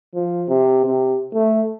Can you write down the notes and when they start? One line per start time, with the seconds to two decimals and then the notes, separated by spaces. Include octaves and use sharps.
0.15 F3
0.49 C3
0.86 C3
1.34 A3